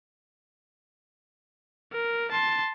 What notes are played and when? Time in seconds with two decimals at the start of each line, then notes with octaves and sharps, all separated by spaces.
1.92 A#4
2.31 A5 C6